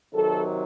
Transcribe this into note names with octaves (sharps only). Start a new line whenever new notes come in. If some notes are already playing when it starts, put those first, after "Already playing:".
C3 D#3 F#3 A4